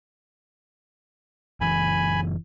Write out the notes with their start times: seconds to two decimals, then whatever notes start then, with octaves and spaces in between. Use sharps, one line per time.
1.61 F#1 E3 G#5 B5